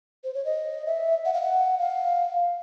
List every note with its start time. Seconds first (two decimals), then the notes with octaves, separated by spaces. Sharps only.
0.24 C5
0.35 C#5
0.45 D#5
0.86 E5
1.25 F#5
1.33 F5
1.42 F#5
1.79 F5